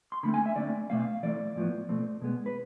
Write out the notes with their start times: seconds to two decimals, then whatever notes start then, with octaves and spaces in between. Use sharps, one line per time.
0.12 C6
0.23 D3 A3 C4 B5
0.34 G#5
0.46 E5
0.56 D3 A3 C4 D5
0.90 B2 A3 C4 F5
1.23 E3 A3 C4 D5
1.56 A2 F3 B3
1.89 B2 A3 C4
2.22 B2 G#3 B3
2.46 B4